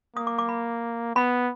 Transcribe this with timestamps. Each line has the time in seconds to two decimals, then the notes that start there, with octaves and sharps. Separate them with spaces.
0.16 A#3 D#6
0.27 D6
0.38 D6
0.49 B5
1.16 B3 B5